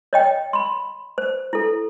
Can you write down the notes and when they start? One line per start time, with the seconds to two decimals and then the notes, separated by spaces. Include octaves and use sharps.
0.13 C#5 D#5 G5
0.53 B5 C6
1.18 C5
1.53 E4 A4